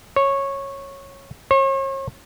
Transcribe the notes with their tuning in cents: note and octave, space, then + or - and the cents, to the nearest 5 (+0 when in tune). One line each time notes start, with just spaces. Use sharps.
C#5 -10
C#5 -40